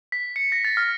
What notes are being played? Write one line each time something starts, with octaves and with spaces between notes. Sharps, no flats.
B6
C#7
A#6
A6
F6